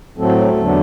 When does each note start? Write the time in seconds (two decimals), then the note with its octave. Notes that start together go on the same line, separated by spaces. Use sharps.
0.17 A2 F#3 A3 C4 A4
0.57 E2 D3 F#3 B3 D4